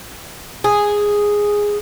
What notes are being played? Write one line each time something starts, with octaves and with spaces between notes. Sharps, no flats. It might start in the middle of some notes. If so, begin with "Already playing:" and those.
G#4